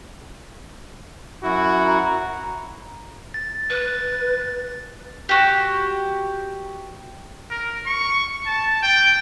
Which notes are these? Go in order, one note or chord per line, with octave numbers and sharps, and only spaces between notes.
F#2 E4 F#4
A#5
A6
B4
F#4 G4
A#4
C#6
A5
G5